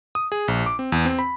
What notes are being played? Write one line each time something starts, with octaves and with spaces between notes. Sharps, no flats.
D#6
G#4
A#1
D6
C4
E2
C4
B5